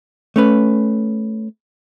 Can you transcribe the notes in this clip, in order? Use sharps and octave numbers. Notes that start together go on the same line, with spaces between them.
A3 C#4 B4